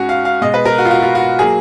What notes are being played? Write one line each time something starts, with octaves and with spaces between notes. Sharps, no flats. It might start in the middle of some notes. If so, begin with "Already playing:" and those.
Already playing: G#2 G#3 C#4 F#4
F5
F5
B2 G#3 D#5
B4
A#4
F#4
F4
F#4
F4
F#4
F#3 A#3 G#4